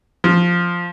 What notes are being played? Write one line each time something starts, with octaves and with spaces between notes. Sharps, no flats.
F3